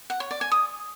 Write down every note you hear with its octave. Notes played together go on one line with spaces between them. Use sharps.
F#5
C#5
D5
G#5
D#6